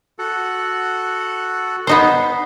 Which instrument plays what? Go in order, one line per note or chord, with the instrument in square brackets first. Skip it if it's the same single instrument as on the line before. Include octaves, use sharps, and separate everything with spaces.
[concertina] F#4 A4 F#5
[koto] B3 D#4 C5